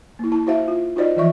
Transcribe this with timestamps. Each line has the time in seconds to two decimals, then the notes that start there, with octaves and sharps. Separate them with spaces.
0.19 A#3 E4
0.32 E4 A5
0.47 E4 F#4 C5 E5 F5
0.68 F4
0.96 D#4 F4 F#4 C5 D5 D#5
1.17 E3 F3 F4 D5 E5 C#6